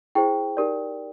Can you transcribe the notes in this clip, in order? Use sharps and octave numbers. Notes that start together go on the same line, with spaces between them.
E4 G#4 C5 G5
D#4 G4 A#4 D5